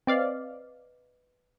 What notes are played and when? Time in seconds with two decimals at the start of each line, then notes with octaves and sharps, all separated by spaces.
0.07 C4 B4 D5 D#5 F5